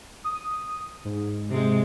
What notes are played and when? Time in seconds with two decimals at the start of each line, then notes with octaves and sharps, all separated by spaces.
0.24 D#6
1.05 G#2
1.49 C3 G#3